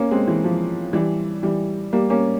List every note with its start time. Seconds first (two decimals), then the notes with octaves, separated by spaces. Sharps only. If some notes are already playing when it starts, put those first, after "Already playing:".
Already playing: A#3 C#4
0.11 G#3 C4
0.27 E3
0.44 F3
0.93 E3 G3
1.43 E3 G3
1.93 G3 A#3
2.10 A#3 C#4